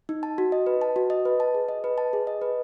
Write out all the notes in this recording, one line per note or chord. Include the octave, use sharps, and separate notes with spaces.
D#4
A5
F#4
D#5
B4
A5
F#4
D#5
B4
A5
G#4
D#5
B4
A5
G#4
D#5
B4